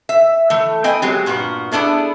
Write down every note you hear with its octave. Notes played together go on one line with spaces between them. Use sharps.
E5
E3 A3
B3 E4 D#5 G5 G#5
F#3 G#3 C4 G4
G2 A#2 B3 F#4
A3 B3 D4 E4 G#4